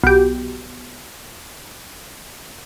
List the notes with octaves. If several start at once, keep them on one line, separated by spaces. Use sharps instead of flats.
B1 G4